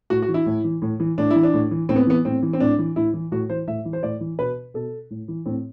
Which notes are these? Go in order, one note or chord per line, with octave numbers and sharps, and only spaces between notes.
A2 F#4
F#4
E3
E4
A2
E3
A2
E3
A2 D4
E4
E3
D4
A2
E3
A2 C4
B3
E3 B3
A2 C4
E3
C4
A2 D4
E3
A2 E4
E3
A2 F#4
E3 C5
A2 E5
E3
C5
A2 D5
E3
B2 B4
B2 A4
A2
E3
A2 C4